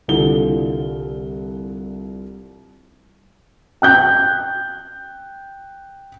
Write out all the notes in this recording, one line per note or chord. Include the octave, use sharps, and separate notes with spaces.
C2 D3 E3 F4 G7
G5 F#6 G6